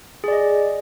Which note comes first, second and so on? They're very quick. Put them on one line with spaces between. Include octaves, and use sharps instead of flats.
G#4 D5 D#5